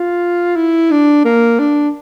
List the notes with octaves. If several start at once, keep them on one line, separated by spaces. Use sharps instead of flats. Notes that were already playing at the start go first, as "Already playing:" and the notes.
Already playing: F4
E4
D4
A#3
D4